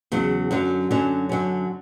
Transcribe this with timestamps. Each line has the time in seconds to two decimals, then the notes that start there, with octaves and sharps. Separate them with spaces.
0.12 E2 C#3 F#3
0.51 F#2 D3 F#3 C#4
0.91 F#2 D3 F#3 C#4
1.29 F#2 D3 F#3 C#4